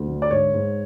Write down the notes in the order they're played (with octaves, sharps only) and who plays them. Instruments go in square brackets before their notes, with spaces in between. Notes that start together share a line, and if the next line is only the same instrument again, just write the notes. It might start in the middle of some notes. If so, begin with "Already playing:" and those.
Already playing: [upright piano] D2
D3
D5
G#2 C#5
G#2